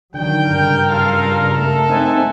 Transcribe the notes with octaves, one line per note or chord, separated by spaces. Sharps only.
D3 D#3 F#3 G5
G2 C#3 A#4
F4 A4 F5 A5 F6
A#5
A3 A4 A#4
A3 C4 D#4 E5 F#5 G#5